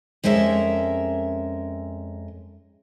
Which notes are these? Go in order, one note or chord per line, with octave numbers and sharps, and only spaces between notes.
F2 G#3 C#4 A#4 E5